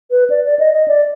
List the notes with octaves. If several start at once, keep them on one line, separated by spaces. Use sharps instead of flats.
B4
D5
D5
D#5
D#5
D5